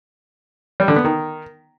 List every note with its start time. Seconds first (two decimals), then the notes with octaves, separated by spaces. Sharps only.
0.80 G3
0.88 D3
0.96 B3
1.05 D#3